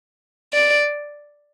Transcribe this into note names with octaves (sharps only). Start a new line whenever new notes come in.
D5